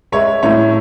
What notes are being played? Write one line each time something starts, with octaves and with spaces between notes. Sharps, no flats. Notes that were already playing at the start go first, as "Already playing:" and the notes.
G#3 C#5 E5
A2 C#5 E5